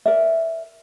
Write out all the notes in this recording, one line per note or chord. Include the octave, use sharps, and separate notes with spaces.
A#4 D5 E5